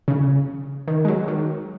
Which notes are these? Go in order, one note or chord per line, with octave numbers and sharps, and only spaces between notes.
C#3
D#3
G#3
F#3
D#3